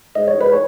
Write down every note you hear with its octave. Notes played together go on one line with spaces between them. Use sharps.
G#2 D#5
C#5
G#2 B4
C#5